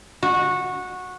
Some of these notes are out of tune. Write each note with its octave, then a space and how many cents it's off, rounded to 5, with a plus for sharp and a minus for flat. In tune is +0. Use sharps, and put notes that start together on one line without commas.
F#4 -15